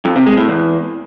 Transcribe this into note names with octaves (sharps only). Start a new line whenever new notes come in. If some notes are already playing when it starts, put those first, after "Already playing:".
F2
C3
G#3
A2
E2